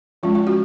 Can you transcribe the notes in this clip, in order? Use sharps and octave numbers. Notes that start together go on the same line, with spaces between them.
F3 G#3 C#4 F4
F4
F#4